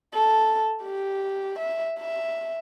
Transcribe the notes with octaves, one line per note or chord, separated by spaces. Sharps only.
A4
G4
E5
E5